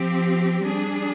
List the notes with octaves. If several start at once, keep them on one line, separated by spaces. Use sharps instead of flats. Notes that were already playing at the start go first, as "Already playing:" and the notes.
Already playing: F3 C4 G4
G3 D4 G#4